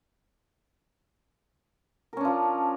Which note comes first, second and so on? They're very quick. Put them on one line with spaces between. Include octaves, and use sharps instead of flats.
A#4 C#4 D4 F3